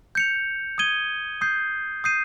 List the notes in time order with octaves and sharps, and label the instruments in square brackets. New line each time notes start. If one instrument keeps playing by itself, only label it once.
[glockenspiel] G6 C#7 F7
D#6 G#6 D#7 G7
D#6 G6 C7
D#6 G6 C7 D#7